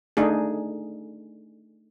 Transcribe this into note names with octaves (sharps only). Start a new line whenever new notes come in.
A3 D4 D#4 G#4